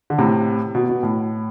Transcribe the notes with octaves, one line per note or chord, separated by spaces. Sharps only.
D3
A2 C3
B2
B2
A2